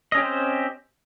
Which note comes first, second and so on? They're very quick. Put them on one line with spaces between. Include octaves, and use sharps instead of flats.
D#5 C#4 G4 C4 C5